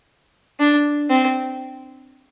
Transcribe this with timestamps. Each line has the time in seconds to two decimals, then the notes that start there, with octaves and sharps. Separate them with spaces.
0.59 D4
1.10 C4